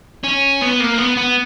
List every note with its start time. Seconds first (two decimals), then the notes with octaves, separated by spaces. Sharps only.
0.23 C#4
0.61 B3
0.80 A#3
0.98 B3
1.17 B3